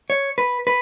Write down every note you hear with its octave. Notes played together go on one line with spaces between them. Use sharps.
C#5
B4
B4